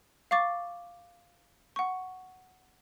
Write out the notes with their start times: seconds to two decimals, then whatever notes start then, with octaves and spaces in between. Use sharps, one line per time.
0.31 F5 C#6 D6 A6
1.76 F#5 C#6